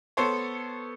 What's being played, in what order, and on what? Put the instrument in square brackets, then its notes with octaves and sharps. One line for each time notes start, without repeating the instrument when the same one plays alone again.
[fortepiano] B3 A4 C5 C#5